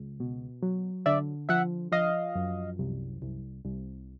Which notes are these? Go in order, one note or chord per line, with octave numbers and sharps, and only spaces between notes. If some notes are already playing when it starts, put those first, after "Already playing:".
Already playing: C#2
B2
F#3
D3 D5 E5
F3 E5 F#5
F3 D#5 F5
F#2
C2
C2
C2